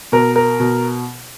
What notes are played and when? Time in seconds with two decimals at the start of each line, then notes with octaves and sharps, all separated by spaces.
0.12 B2 A#4
0.36 A#4
0.60 B2